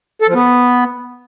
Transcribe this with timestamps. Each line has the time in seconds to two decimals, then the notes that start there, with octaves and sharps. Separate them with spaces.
0.22 A4
0.28 F3
0.34 B3